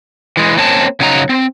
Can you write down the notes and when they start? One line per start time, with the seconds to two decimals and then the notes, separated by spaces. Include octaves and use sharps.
0.37 E3 G#3
0.57 A#3 C4 C#4 A5
1.00 C#3 F#3 D#4 G#5 A#5
1.29 C4